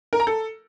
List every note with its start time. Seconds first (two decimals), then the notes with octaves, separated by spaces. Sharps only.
0.13 A#4
0.20 A#5
0.27 A4